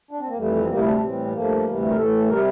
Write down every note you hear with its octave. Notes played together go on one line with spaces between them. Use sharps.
D4
C4
A#3
F2 E3 G3 A3
C4
D2 C3 G3 A#3
E4
D4
A2 E3 G3 C4
G2 F3 A3 A#3
D2 C3 E3 G3
A#4
A2 E3 A3 A4
C3 G3 A#4